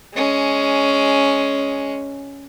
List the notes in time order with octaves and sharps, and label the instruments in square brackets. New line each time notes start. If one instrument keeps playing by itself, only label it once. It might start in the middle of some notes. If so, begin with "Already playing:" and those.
[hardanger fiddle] G#3 C#4